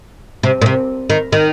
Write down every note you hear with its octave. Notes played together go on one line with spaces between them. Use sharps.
C3
A#2
C3
D#3
D#3